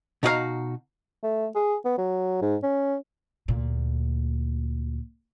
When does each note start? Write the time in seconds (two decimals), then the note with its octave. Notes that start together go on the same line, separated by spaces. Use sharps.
0.23 B2 D#4 F#4 G4 F5 A#5
1.23 A3
1.55 G#4
1.85 B3
1.98 F#3
2.42 G#2
2.63 C#4
3.48 D2 A#2